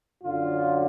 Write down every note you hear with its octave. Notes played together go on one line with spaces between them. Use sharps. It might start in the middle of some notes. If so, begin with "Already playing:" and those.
F#2 D3 F#3 F4